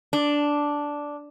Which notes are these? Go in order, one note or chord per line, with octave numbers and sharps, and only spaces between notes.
D4